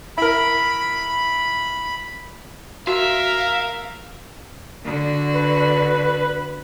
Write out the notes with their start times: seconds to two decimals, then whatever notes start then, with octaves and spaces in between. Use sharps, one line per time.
0.18 E4 A#4 B5
2.87 F#4 A#4 E5 F5
4.84 D3 F#4
5.35 B4